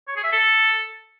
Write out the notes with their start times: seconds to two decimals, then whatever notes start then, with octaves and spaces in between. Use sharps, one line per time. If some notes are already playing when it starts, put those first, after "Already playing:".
0.08 C#5
0.16 G#4
0.24 E5
0.32 A4